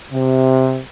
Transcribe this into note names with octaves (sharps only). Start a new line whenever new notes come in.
C3